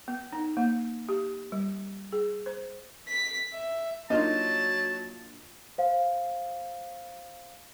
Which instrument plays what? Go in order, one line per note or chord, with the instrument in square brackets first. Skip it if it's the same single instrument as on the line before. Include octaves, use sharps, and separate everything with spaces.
[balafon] B3
D#4
A#3
G4
G3
G#4
C5
[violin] B6
E5
[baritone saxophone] F#3 [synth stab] A#3 D4 F4 [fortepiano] D#4 [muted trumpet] A5
[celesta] C5 F5